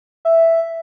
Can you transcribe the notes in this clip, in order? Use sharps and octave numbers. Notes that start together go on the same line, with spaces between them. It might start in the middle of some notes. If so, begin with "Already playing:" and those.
E5